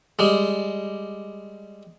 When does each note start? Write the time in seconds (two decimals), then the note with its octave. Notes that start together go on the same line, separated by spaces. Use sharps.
0.19 G3 G#3